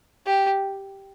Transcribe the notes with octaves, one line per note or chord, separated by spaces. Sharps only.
G4